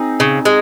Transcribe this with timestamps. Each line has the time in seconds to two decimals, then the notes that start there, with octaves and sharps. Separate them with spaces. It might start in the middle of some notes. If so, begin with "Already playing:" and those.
Already playing: C4 D#4 G#4
0.20 C#3
0.45 G#3